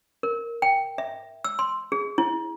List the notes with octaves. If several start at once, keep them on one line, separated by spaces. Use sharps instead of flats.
A#4
G5
E5
E6
C6
G#4
E4